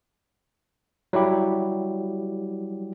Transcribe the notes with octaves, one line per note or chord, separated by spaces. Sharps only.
F#3 G3 E4 G4